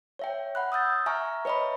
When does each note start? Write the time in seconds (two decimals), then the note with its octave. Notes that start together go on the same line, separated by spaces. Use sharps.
0.19 C#5 E5 G5
0.55 F#5 B5 F#6
0.72 D#6 E6 G6 A6
1.06 E5 G#5 A#5 C#6 F6
1.45 B4 C#5 D#5 E5 B5